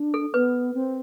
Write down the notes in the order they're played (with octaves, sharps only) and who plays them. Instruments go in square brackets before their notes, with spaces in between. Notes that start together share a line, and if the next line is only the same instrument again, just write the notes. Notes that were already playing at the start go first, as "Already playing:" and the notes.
Already playing: [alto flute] D4
[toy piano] A4
[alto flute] B3 [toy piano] B4
[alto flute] C4